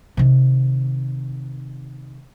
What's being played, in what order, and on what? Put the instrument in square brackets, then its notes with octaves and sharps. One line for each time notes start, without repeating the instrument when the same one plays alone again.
[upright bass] C3 D#3